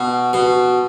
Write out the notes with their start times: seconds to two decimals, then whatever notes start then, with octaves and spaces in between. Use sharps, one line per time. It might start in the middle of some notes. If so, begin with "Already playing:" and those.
Already playing: B2
0.33 B2